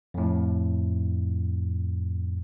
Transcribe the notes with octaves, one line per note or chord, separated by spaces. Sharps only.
F2 A2